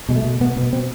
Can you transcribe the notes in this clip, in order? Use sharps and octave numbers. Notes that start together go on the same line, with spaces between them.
B2 G#3
A3
B2
B2 B3
B2 B3
B2 C4